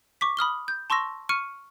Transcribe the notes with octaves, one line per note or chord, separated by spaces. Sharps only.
C#6 D6 B6
B5 D#6 F6 G7
G6
A5 C6 C#6 E6 A#6
C#6 F6 C#7 D#7